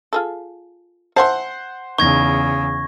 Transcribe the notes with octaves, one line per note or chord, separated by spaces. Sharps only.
F4 G#4 A4
C5 E5 F#5 G#5 A5 C6
E2 C#3 D#4 C#6 G#6 A#6